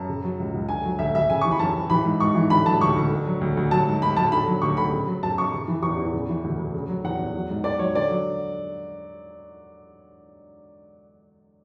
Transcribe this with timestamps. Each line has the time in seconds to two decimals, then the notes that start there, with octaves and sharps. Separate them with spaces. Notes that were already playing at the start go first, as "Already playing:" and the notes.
Already playing: F#2 A5
0.09 C#3
0.24 F#3
0.40 C#2
0.54 C#2
0.69 D3 G#5
0.85 F#3
0.99 D2 E5
1.15 D2 E5
1.30 C#3 G#5
1.41 E3 C#6
1.51 B5
1.60 F#2 A5
1.74 F#2
1.90 E3 B5
2.05 G#2
2.20 G#2 C#6
2.35 E3
2.50 D3 B5
2.66 F#3 A5
2.80 D2 C#6
2.96 D2
3.11 D3
3.26 F#3
3.41 D2
3.57 D2
3.71 F#3 A5
3.86 G#2
4.02 G#2 B5
4.17 F#3 A5
4.32 D3 B5
4.48 F#3
4.62 D2 C#6
4.77 D2 B5
4.92 C#3
5.07 F#3
5.22 F#2 A5
5.38 F#2 C#6
5.54 C#3
5.68 E3
5.83 E2 C#6
5.98 E2
6.14 C#3
6.29 E3
6.44 D2
6.59 D2
6.74 C#3
6.89 F#3
7.04 E2 F#5
7.19 E2
7.35 F#3
7.50 G#2
7.64 G#2 D5
7.79 F#3 C#5
7.94 D3 D5
8.10 F#3